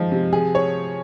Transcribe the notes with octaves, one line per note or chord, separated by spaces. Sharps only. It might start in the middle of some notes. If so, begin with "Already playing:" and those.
Already playing: F3 G#3 D#4
C3
G#4
C#5